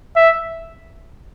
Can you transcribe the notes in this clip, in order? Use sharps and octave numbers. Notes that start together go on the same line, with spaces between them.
E5